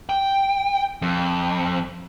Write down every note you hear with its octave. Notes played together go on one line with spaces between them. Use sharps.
G5
F2